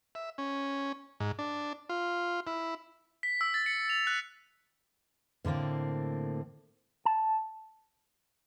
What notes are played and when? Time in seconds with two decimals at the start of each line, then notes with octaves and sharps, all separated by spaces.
0.15 E5
0.38 C#4
1.20 G#2
1.39 D4
1.89 F4
2.47 E4
3.23 B6
3.41 E6
3.54 A6
3.66 C#7
3.90 F7
4.07 F#6
5.45 A2 D3 A#3 C4
7.05 A5